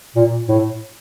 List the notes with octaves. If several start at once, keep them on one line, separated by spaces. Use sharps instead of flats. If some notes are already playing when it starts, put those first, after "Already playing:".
A#2
A2